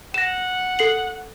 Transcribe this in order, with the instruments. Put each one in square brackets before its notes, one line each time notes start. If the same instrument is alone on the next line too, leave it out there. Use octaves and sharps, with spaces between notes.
[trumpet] F#5 [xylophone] A#6 E7
[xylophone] A4 C7 F#7